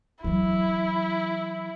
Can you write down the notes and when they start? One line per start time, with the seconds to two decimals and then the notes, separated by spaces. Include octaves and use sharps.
0.24 E3 F#3 E4